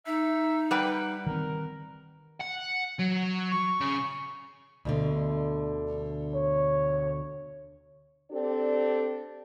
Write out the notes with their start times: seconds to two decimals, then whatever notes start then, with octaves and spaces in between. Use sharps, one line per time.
0.06 D#4 E5
0.71 G3 B4 F#5 G5
1.26 D#3 C4 A#4
2.41 F#5
2.99 F#3
3.52 C#6
3.81 C#3
4.85 D2 B2 D3
6.35 C#5
8.31 C4 D4 G4 A4 D5